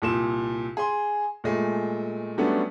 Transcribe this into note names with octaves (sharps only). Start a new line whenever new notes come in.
C2 A#2 E7
G#4 C6
A#2 G#3 A3
F#3 G3 A3 B3 C#4 D4